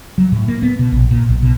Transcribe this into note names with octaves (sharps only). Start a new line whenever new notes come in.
F#3
A2
A#3
B3
B2
A#1
A#2
B1
B2